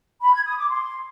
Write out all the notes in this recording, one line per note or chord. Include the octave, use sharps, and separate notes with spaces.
B5
G#6
D#6
D6
C6